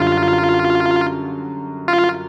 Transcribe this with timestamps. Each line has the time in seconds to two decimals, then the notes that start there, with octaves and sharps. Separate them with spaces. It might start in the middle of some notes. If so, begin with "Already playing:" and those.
Already playing: F#2 D3 G3 F4
1.88 F4